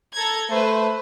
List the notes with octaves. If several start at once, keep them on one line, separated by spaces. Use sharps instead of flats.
A4 A#5 G#6
A3 B4 C5